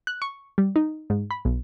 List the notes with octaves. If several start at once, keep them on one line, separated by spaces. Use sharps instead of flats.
F#6
C#6
G3
D#4
G#2
B5
B1